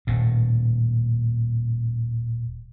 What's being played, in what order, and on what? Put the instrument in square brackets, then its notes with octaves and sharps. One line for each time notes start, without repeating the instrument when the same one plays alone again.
[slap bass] D#1 A2